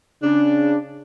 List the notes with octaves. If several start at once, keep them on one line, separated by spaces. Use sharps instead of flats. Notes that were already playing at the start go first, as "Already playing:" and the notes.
C#3 D4